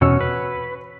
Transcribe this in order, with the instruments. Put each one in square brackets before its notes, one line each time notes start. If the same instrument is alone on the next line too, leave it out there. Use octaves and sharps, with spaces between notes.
[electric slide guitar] E2 B2 C#4 [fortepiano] F#4 C#5 E6
[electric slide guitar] B4